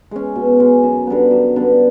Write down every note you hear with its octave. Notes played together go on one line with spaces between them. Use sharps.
G#3 C#4
B2
G#3 C#4
F#2
D3 G3 B3
F#2
D3 G3 B3